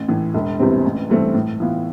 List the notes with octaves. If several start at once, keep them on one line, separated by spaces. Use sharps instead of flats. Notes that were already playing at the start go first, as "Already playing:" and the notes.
Already playing: A1
A2 E3
E1
E2 C3 G3 C4
A1
G2 E3 A3 C4
A2
E3 B3 F4